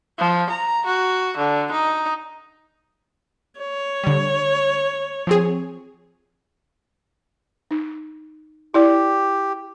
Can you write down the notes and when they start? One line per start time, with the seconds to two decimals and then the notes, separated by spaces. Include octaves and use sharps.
0.19 F3
0.50 A#5
0.86 F#4
1.37 D3
1.72 D#4
3.60 C#5
4.04 D3 G3
5.27 F3 C4 G#4
7.71 D#4
8.74 E4 G4 D5